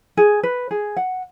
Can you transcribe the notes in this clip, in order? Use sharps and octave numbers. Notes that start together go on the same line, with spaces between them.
G#4
B4
G#4
F#5